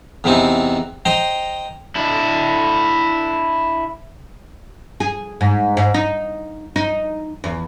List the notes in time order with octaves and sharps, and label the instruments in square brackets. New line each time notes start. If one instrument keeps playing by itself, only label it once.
[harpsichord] E2 C3 E3 C4 D#4
C5 D#5 G5 A#5 C6
[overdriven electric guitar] D4 E4
[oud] G#4
G#2
G#2
D#4
D#4
E2